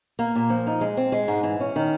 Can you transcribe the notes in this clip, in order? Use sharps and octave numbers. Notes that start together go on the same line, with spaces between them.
A#3
A#2
F3
D#4
G#3
C4
G#3
G#2
E3
C#4
D#3